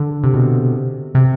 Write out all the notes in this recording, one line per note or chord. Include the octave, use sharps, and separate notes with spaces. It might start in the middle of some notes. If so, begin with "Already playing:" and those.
Already playing: D3
C3
B2
C3